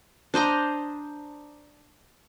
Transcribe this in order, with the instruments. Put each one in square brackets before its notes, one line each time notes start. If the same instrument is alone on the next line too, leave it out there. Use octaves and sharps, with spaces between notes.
[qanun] D4 C5 D#5 A#5